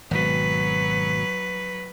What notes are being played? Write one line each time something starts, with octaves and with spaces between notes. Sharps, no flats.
G#1 B2 F#3 B4